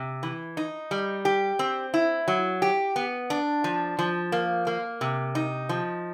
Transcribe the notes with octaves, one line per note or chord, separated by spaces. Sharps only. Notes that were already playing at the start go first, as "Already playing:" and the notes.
Already playing: C3
E3
D#4
G3
G4
C4
E4
F#3
G4
B3
D4
F3
F3
A#3
A#3
C3
D#4
F3